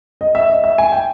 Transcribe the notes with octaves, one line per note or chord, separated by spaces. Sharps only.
D#5
E5
D#5
E5
G#5
G5